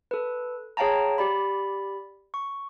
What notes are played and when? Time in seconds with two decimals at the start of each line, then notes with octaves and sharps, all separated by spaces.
0.11 A4 B4
0.77 G#4 C#5 F5 G5 A5 A#5
1.18 G4 D5 B5
2.34 C#6